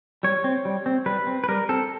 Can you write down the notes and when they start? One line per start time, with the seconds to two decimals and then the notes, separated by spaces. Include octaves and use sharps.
0.23 G3 C#5
0.44 C4
0.65 G3
0.86 C4
1.06 G3 B4
1.27 C4
1.44 B4
1.49 G3 A#4
1.69 C4 A4